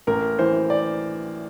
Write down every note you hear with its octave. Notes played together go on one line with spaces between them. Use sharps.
A1 A#4
E3 C5
D5